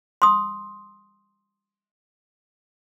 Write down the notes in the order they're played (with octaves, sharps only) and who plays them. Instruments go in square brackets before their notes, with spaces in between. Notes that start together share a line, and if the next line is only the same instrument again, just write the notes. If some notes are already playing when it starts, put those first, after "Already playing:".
[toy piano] C6 D#6